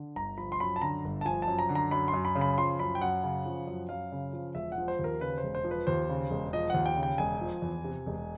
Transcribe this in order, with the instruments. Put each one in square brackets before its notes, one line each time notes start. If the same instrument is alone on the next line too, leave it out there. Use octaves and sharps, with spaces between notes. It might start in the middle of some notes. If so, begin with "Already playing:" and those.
Already playing: [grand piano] D3
G1 A#5
F3 B5
C6
F#2 B5
A5
D3 A#5
G1
A5
F3 G#5
A5
F#2
A#5
D3
A#5
F#2 B5
C6
F#2
B5
C#3
B5
F3 C6
F#2 B5
G5
F#2 F#5
C#3
F3
F#2
F#2 F5
C#3
F3
E1 E5
F#5
F3
C5
D#2 A#4
C#3 B4
C5
E1
C5
F3
B4
D#2 C5
C#3
E1
F3 D#5
D#2 F#5
G5
C#3
G5
E1 G#5
F3
E2
C3
E1